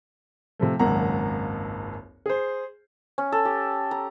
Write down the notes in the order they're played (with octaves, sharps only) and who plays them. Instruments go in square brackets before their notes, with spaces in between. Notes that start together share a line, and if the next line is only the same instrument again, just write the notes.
[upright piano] C3 F3 A3
G#1 C#2 F#2 A#3 F#5 A#5
G#4 C5
[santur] C#4
A4
G4
A#5